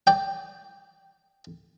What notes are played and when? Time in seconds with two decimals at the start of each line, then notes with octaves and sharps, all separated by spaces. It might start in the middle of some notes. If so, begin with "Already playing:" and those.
0.07 D5 G5